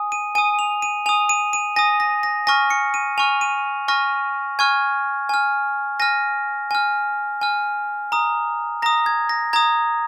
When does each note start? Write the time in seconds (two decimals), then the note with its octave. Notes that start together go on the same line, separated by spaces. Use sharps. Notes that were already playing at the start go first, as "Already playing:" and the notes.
Already playing: G#5 D#6
0.12 D#7
0.35 G#5 D#6 D#7
0.59 F7
0.82 D#7
1.06 G#5 D#6 F7
1.29 D#7
1.53 D#7
1.76 G#5 D#6 A#6
2.00 A#6
2.23 A#6
2.47 G#5 C#6 F6 A#6
2.70 C#7
2.94 D#7
3.18 G#5 C#6 F6 F7
3.41 D#7
3.88 G#5 C#6 F6 A#6
4.59 G#5 C#6 F6 G#6
5.29 G#5 F6
6.00 G#5 F6 A#6
6.71 G#5 F6
7.41 G#5 F6
8.12 A#5 D#6
8.82 A#5 D#6 A#6
9.06 G#6
9.29 A#6
9.53 A#5 D#6 G#6